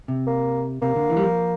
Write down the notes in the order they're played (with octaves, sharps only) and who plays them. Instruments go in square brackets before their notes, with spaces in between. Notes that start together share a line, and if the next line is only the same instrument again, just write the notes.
[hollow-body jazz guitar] C3
[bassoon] A#3
[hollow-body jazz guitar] C3 [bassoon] A#3
[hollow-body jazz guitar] D3
E3
G3
F3